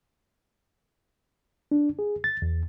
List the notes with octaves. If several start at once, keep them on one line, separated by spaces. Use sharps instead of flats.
D4
G#4
A6
E2